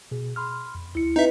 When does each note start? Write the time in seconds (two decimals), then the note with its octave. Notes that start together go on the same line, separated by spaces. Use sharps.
0.11 B2 G#4
0.36 B5 C6 F6
0.75 F2
0.95 D2 E4 C#7
1.16 C4 D#4 B4 D#5 E5